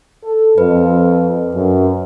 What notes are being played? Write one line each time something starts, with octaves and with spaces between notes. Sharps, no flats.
A4
F2 B4
F#2